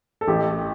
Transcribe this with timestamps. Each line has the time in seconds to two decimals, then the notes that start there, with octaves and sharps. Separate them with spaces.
0.21 A4
0.28 A1 G4